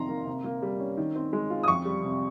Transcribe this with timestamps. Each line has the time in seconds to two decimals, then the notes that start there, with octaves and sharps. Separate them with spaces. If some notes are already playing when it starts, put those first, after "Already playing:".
Already playing: F2 C3 D#3 A#5 C6
0.09 A#3
0.27 C3
0.44 A#3
0.62 G3
0.80 C#4
0.97 D#3
1.16 C4
1.33 G#3
1.50 F4
1.63 D#6
1.67 F2 C#6
1.85 G3
2.04 C3